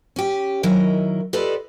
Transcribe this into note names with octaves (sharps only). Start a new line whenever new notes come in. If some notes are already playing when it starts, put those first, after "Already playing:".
C#4 G4
D#3 F#3 E4 A#4 D#5
F4 G4 A4 B4 D5 D#5